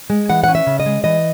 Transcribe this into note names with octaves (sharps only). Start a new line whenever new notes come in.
G#3
E3 F#5
C#4 F#5
E5
C#3
D#5
G#3
E3 D#5